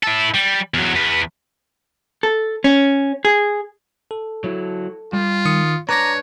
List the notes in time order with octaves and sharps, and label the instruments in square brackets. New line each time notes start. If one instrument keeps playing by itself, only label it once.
[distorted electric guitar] E4 A4
G3
E2 F#3
E2 B3
[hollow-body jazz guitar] A4
C#4
G#4
[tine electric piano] A4
[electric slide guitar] F#3 E4
[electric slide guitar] G3 [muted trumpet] F4
[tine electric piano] D#3 D#6 C#7
[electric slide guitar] D4 B4 [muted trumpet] C#5 [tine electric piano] A#5 D6 A#6